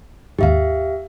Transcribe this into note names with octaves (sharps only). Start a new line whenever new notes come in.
D#2 G#2 G4 E5 F5